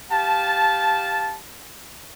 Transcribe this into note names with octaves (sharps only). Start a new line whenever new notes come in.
G4 F5 A5